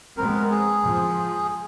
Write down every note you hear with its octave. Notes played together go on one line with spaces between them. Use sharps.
G#3 B3 C4 A#4
G#4
F3